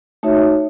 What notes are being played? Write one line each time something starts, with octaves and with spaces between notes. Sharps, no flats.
A3 D#4 F#4 C#5 E5